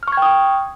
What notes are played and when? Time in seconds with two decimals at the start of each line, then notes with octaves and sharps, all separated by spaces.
0.03 F6
0.08 C#6
0.12 G#6
0.17 G5
0.22 D#6